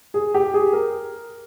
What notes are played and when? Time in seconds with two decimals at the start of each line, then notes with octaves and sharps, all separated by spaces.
0.14 G#4
0.34 G4
0.54 G#4
0.73 A#4